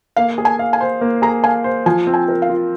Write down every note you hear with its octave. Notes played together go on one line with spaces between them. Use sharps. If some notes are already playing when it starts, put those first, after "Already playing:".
A#3 F5
G#4
G#5
F5
G#5
C5
A#3
G#4 A#5
F5 G#5
C5
F3 G#5
C4
G#5
A#4
F5
F4